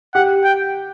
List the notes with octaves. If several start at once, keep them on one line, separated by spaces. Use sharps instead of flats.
G4 F#5
G5